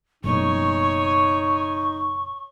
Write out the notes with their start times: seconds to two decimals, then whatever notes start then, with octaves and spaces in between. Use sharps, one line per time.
0.24 F#1 B2 D#4 C#5 G#5 C#6